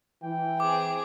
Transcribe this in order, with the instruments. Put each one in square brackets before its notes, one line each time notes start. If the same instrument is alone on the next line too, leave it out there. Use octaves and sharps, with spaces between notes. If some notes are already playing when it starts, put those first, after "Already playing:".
[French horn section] E3 [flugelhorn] G5
[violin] C4 G#4 [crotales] D6